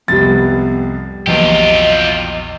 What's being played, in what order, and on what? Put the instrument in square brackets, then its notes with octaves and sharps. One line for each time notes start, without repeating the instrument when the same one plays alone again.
[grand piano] C2 F2 [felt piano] G3 A6 [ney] B3
[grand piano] A#1 E2 F#3 [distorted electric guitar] F4 G4 [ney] D#5